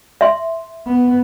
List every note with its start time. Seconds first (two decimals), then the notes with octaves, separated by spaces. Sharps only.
0.21 E5 C6
0.87 B3